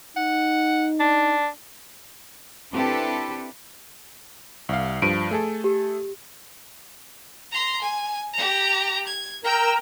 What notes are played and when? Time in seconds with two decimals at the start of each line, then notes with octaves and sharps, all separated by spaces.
0.17 D#4 F#5
1.00 D4
2.72 C4 D4 E4 G4 A4 B4
4.69 C2 F5
5.02 G2 F3 D7 D#7
5.31 A3 G#4 A4
5.64 G4
7.51 A#5 C6
7.81 G#5
8.33 G4 A#5
9.06 G#6
9.44 A#4 G5 A#5 E6